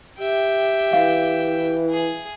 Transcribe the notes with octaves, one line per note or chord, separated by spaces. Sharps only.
G4 E5 G5
E3 F5
G#4